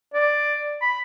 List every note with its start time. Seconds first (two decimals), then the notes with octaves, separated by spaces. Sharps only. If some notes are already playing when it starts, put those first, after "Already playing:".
0.14 D5
0.81 B5